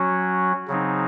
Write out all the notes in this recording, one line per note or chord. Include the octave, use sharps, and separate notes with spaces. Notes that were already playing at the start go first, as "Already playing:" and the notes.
Already playing: F#3 C#4 F#4
C#3 F#3 C4 D#4